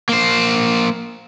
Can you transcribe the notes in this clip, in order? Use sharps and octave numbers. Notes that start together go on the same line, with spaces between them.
A#3 C5